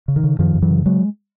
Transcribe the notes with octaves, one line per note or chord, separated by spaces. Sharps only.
C#3
D#3
C#3
F#2 D#3 F3
F#2
E3 F#3
C#3
F#3 G#3